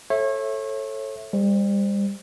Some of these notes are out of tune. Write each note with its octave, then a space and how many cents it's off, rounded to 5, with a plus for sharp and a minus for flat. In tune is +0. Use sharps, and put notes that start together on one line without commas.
A4 +0 C#5 -30 E5 +0
G3 +35 C5 +0